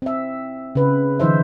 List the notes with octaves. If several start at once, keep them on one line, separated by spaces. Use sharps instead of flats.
C4 E5
C#3 B4
D#3 F3 D#4 C5 E5